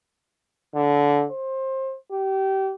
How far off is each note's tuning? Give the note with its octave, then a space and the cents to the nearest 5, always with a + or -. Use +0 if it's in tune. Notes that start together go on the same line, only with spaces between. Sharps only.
D3 -20
C5 +25
G4 -25